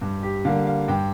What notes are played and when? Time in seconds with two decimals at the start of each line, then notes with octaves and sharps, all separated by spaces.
0.01 G2
0.23 G4
0.45 D3 G3 A#3 F5
0.67 F5
0.88 G2 G5